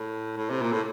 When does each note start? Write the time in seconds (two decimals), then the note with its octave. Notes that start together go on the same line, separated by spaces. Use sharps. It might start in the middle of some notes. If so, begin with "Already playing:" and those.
Already playing: A2
0.37 A2
0.50 C3
0.62 A#2
0.72 A2